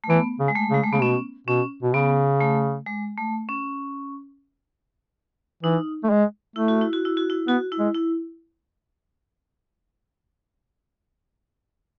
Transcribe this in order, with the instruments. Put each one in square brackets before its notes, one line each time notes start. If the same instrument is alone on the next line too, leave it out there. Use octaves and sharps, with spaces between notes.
[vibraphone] A3
[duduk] E3 [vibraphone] B3
[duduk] C#3
[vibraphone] G#3
A3
[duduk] C#3 [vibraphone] G#3
[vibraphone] A3
[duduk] C#3 [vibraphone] B3
[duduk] B2 [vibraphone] C#4
[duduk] B2 [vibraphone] C#4
[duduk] B2
[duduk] C#3 [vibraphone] B3
[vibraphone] A3
G#3
A3
C#4
[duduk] E3 [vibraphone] D#4
[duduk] A3
G#3
[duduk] A3 [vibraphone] E4
[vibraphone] F#4
E4
F#4
E4
F#4
E4
[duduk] B3 [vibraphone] F#4
[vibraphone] E4
[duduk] G#3
[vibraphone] E4